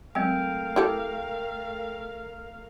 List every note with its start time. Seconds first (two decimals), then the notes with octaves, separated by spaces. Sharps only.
0.15 F#3 G#3 A3 C4 A#4 F5 G5
0.76 E4 G4 A4